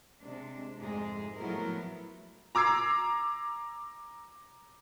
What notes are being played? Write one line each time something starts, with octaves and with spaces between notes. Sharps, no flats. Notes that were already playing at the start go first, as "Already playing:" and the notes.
C3 G#3 D4
F2 G#2 C3 G#3 G#4
A2 F3 F#3 B3 E4 A#4
A#5 D6 E6 G#6 C7